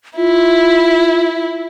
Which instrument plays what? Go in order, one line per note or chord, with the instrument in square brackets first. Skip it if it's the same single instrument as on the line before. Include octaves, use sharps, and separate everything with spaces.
[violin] E4 [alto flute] F4